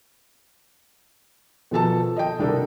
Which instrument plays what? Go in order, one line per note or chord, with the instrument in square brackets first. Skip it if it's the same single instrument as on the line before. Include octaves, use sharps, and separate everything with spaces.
[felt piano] B2 F3 A4 A5
D#5 G5
C2 D4 A4 A#4